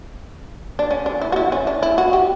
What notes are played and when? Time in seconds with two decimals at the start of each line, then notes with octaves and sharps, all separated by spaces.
0.79 D4
0.91 C#4
1.06 D4
1.22 E4
1.32 F#4
1.36 E4
1.52 C#4
1.67 D4
1.83 E4
1.98 F#4
2.13 G4